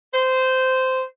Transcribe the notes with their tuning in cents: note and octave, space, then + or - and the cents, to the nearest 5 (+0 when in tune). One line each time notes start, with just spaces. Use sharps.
C5 -15